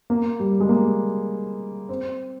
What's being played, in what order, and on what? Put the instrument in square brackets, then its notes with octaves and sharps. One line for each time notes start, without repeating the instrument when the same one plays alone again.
[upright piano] A#3
G3
G#3
A#3
C4